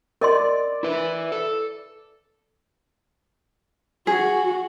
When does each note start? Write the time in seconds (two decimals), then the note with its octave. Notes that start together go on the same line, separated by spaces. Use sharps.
0.21 A#4 D5 D#5 C6
0.83 E4 B4 E5
1.32 A4
4.07 F#4 G#4